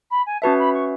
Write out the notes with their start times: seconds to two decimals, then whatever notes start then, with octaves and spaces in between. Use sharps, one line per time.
0.11 B5
0.26 G#5
0.42 C#4 F#4 B4 E5 A5
0.58 B5
0.73 C#6